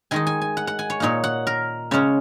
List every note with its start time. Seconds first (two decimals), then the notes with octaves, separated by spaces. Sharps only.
0.11 D#3 G#3 D#4 G#5
0.27 G#5
0.42 G#5
0.57 F#5
0.67 F#5
0.79 G#5
0.90 C#5
1.00 A#2 A#3 D#4 C#5
1.24 F#5
1.47 A#4
1.91 C#3 G#3 C#4 C#5